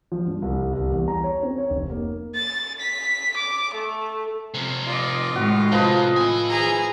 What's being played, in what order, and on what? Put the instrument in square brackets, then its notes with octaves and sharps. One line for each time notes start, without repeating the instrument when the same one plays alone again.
[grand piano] F3
G2
C2
C2
E2
A#5
C#5
C4
C#5
F1
A#3
[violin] A6
B6
D6
A3
[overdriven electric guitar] C3 F3
[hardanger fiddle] F4 [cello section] D5 D#5
[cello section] A2 D#3 G#3 [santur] F#4
[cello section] A2 [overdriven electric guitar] C3 [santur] F3 B4 D#5
[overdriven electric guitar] E4 G#5
[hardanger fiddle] G#4 A#5